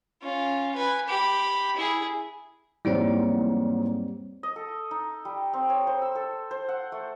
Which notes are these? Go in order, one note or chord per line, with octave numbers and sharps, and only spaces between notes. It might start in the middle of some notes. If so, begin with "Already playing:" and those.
C#4 F4
B4 G#5
G4 B5
E4 G#4
E2 G#2 F#3 G3 A#3 C4 C#5
D#5
A4
D#4
G3
C4
C#5
C5
E6
A4
C5
F#5
A3